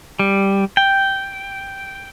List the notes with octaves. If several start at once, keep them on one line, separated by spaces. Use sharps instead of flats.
G3
G5